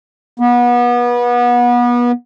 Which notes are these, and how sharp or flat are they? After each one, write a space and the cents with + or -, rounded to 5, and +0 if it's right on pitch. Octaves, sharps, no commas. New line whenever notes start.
B3 -30